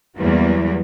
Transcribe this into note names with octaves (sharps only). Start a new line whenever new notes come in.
E2 E3 F#3 G3 A#3 B3